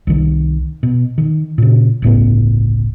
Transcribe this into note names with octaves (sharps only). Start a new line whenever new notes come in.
C2 D#3
B2
D#3
A#2 C#3
G1 C#2 A2 B3